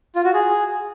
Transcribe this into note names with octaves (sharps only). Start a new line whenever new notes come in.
F4
F#4
G#4